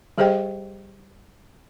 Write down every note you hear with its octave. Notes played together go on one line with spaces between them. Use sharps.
G3 G4 G#4 C5 D#5 G5